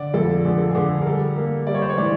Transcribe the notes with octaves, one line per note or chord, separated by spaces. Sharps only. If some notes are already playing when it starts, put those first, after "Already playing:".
Already playing: D3 D5
F2 A4
D3 G#4
A4
D3 G#4
A#4
G3 A4
A#3
G3 D5
C#5
C5
C#5
E3 D5